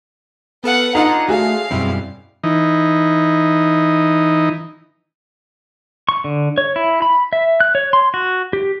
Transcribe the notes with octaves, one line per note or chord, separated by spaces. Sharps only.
B3 A4 B4 F5 F#5
D4 D#4 F4 G#4 A4 F#5 A#5
A3 F#4 G#4 F5
F#2 B2 G3 C4 E4
E3 D#4
C#6
D3
C#5
E4
B5
E5
F#6
C#5
C6
F#4
G4